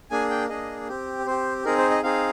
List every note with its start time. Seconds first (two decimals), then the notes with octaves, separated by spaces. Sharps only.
0.10 A#3 D4 G#4 G#5
0.30 G5
0.49 A#3 D4 G#4 D#5
0.88 C4 G4
1.26 C4 G4 C5
1.65 C4 D#4 G#4 A#4
1.78 C5
1.91 D#5
2.03 C4 D#4 G#4 F5